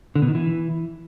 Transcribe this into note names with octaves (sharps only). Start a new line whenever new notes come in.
D3
B2
D#3
E3